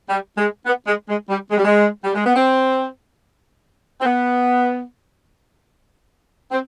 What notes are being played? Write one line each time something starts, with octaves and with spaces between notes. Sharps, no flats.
G3
G#3
B3
G#3
G#3
G3
G#3
G3
G#3
G3
G#3
B3
C4
C4
B3
C4